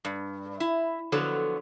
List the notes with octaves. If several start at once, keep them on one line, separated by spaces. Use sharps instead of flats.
G2
E4
D3 F3 F#3 B3 A4 C#5